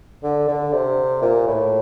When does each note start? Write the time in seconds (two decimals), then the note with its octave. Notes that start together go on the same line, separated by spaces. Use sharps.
0.23 D3
0.48 D3
0.73 C3
1.22 A#2
1.47 A2